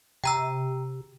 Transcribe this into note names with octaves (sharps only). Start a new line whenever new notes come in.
C3 G5 A#5 E6